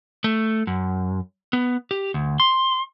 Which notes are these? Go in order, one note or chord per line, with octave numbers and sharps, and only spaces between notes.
A3
F#2
B3
G4
D2
C6